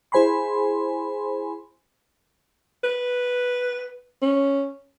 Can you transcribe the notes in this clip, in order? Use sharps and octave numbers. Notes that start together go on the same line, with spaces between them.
E4 G#4 C5 G#5 B5 C6
B4
C#4